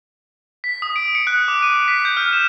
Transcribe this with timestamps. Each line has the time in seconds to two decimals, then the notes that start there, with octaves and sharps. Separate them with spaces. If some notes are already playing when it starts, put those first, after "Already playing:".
0.64 B6
0.82 D#6
0.96 D7
1.15 C#7
1.27 F#6
1.48 D6
1.62 D#7
1.88 B6
2.05 G6
2.17 F6
2.33 E7